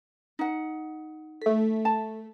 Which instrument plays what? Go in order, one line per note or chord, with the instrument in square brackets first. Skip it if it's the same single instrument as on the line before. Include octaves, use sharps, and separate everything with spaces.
[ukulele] D#4 F#5
[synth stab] A3 B6 [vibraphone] A4
[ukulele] A5